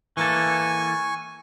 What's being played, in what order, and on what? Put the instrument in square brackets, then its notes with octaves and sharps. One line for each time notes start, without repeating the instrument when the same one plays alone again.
[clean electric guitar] E3 A#3 A4 [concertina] G#5 C#6